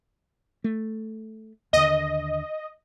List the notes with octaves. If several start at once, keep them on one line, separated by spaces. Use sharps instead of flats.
A3
D#2 D3 D#5